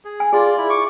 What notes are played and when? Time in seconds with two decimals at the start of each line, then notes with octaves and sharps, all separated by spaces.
0.05 G#4
0.20 G#5
0.33 F4 G#4 D5 C6
0.58 E4
0.70 C#6 D6